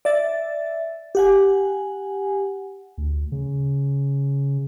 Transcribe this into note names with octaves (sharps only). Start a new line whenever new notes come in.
D5 E5 A6
G4 F#5 G#5
D2
C#3